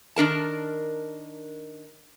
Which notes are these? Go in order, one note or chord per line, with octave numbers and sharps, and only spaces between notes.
D#3 D4 A#4 A5